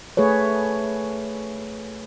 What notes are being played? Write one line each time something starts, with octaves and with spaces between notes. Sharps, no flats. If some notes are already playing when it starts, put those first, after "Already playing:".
A3 G#4 B4 C#5